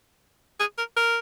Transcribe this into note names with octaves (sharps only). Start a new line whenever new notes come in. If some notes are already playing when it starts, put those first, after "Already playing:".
G#4
A#4
A#4